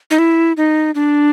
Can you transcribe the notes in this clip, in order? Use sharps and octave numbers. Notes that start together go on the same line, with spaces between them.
D#4
E4
D#4
D4